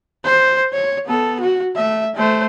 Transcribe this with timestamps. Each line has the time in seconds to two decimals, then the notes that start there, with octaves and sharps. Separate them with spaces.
0.24 C5
0.73 C#5
1.06 B3 A4
1.40 F#4
1.76 A3 E5
2.15 A3 C5